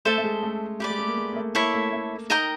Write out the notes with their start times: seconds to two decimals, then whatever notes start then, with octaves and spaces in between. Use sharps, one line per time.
0.05 A3 A4 C5 E5 A5
0.18 A3
0.23 G#3
0.43 A3
0.80 A3 G4 B4 D5
0.90 G#3
0.99 A3
1.08 A#3
1.17 G#3
1.33 A#3
1.36 A3
1.55 A#3 E4 A4 C#5 E5
1.74 A3
1.93 A3
2.30 D#4 A#4 D#5 G5 A#5